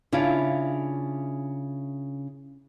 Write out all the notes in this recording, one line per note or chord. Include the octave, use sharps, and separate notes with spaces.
C#3 D4 E4 F4